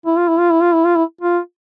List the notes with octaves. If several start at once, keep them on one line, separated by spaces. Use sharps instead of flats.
E4
F4
E4
F4
E4
F4
E4
F4
E4
F4